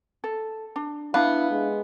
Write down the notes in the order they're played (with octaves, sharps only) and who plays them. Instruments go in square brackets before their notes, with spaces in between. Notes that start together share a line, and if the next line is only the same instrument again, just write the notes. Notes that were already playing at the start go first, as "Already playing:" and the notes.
[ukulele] A4
D4
[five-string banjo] B3 [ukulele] D4 F5 [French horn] E4
[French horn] G#3